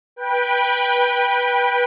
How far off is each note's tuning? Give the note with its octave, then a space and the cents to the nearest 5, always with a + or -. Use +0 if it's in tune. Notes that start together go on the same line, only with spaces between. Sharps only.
B4 -20 G5 +10